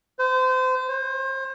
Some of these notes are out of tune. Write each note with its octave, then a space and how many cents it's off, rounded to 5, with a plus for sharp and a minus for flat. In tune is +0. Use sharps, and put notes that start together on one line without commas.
C5 -30
C5 +35